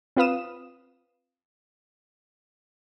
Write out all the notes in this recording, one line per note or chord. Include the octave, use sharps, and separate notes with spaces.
C4 F4 B4 F5 D#6 E7